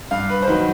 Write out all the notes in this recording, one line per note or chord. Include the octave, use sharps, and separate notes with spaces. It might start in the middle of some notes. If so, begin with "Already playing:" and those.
G2 F5
B4
C5
D#3 F#3 B4